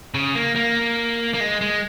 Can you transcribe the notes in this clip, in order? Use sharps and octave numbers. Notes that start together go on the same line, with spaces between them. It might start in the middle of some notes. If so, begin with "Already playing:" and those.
C#3
A#3
A#3
A#3
G#3
G#3